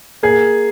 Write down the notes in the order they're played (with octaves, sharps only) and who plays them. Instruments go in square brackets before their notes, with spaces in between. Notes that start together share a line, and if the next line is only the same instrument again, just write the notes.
[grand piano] A#3 G#4